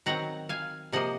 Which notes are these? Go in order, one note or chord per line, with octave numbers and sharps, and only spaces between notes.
D#3 F#3 C4 F#5 A#5
F5 G#5
C3 F3 A#3 D#5 F#5